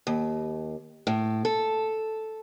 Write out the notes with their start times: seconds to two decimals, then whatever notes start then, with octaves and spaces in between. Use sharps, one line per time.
0.07 D#2
1.07 A2
1.45 A4